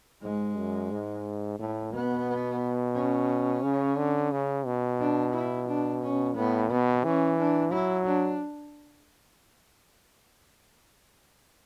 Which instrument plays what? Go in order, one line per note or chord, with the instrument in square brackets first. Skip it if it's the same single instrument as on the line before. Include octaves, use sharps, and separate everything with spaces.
[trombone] G#2 [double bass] G#3
[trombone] F#2
G#2
[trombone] A2 [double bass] A3
[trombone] B2 [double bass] B3
[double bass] C#4
[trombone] C#3
D3
C#3
B2
[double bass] D4
E4
D4
C#4
[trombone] A2 [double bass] B3
[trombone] B2 [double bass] B3
[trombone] E3 [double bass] C#4
[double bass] D4
[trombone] F#3 [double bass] E4
[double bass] D4